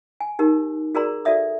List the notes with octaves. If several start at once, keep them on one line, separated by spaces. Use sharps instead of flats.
G#5
D#4 G4 A#4
F#4 G#4 A#4 D5 A#5 C6
F#4 A4 D5 E5 D#6